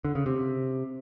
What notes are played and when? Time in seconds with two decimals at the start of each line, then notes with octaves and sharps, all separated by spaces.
0.05 D3
0.15 C#3
0.26 C3